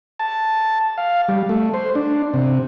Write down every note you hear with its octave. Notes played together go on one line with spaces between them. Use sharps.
A5
F5
G3
A3
C5
D4
C3